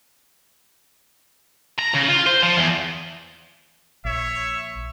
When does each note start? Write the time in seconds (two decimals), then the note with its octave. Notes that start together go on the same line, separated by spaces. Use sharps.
1.78 A#5
1.94 C#3
2.08 F4
2.26 C5
2.43 F3
2.57 E2
4.05 A#1 C#5 E5